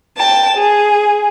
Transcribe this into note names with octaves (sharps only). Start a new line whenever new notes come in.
G5 A5
G#4